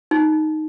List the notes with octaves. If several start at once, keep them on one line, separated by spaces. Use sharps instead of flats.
D#4